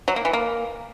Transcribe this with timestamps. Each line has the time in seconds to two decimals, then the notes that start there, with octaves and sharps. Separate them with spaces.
0.08 F#3
0.16 A#3
0.25 E3
0.33 A#3